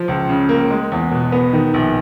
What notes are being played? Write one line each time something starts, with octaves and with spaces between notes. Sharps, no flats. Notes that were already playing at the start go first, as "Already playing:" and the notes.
Already playing: F3
C#2
C#3
A#3
G#3
E2
B2
B3
D#3
A#1